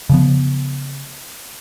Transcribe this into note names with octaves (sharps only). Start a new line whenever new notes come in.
C#3 F3 B3